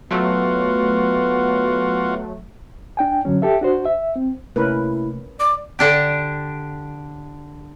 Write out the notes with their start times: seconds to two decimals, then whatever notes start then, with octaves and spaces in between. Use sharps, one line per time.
0.11 F#3 A3 B3 F4 F#4
2.97 D4 G5 G#5
3.25 F#2 D3 F#3 C#4
3.42 G4 A4 E5
3.61 D4 F#4 C5
3.85 E5
4.16 C4
4.56 C3 A3 A#3 C#4 E4 A#4 B4
5.40 D5 D6
5.79 D3 D4 G4